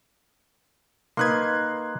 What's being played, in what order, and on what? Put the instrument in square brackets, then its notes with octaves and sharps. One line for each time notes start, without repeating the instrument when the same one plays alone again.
[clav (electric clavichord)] A#3 D#4 B4 [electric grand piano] C6 F#6 G#6